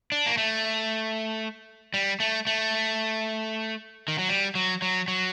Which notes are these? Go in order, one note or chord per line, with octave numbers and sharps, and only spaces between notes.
D4
A#3
A3
G3
A3
A3
D#3
F#3
G3
F#3
F#3
F#3